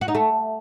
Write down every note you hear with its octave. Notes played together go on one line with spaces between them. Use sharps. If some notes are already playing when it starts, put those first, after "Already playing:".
F#4
D#4
A3